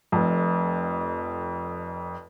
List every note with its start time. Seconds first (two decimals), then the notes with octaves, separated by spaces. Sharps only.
0.12 F1 F2